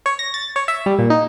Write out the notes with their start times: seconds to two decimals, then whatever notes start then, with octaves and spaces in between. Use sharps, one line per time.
0.06 C#5
0.19 A#6
0.34 A6
0.56 C#5
0.68 E5
0.86 G3
0.99 A#2
1.10 D#4